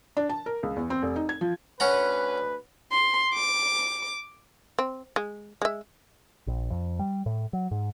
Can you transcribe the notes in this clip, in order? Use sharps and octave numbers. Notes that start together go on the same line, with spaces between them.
D4
A5
A#4
C#2
E2
C4
F1
D#4
G#6
F3
D2 C#4 B4 F#5 A#5
C6
D6
C4
G#3
G#3 E5
A#1
F2
G3
A2
F#3
G#2